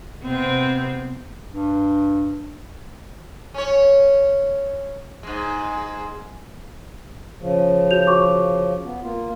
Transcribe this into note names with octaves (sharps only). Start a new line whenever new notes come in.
C3 B3 C4
G2
C#4 C#5
G#2 G#3
C#3 F3
F#4 G6 F7
F#4 C#6 D6
B3
A#3 F4